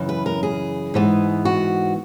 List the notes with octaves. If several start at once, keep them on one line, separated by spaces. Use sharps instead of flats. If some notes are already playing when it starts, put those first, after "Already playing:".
Already playing: F#2 C#3 E3
B4
A#4
G#4
G#2 E3 B3
F#4